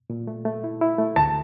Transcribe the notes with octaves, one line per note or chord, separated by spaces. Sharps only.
A#2
A3
A3
E4
E4
A3
D2 A5